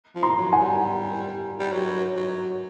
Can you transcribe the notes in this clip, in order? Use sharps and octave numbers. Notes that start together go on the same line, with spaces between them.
F3
A#5 C6
F#3
F#5 G#5
G3
G3
F#3
F#3